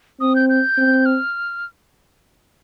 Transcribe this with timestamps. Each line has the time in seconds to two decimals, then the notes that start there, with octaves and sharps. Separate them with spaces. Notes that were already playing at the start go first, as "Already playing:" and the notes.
0.21 C4 D#6
0.36 G6
0.49 G6
0.78 C4
1.06 F6